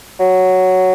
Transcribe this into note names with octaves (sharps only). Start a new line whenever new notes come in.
F#3